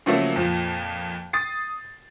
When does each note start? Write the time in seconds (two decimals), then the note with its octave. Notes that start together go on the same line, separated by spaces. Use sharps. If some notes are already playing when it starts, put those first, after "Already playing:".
0.06 C#3 F3 F#3 A3 A#3 E4
0.36 F2 A#2 F3
1.33 D#6 A6 C7